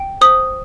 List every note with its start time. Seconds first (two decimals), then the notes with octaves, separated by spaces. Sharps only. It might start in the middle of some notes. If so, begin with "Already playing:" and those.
Already playing: G5
0.21 C5 D#6